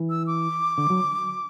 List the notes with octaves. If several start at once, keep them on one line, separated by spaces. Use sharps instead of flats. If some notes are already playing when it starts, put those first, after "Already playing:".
Already playing: E3
E6
D6
D3
F#3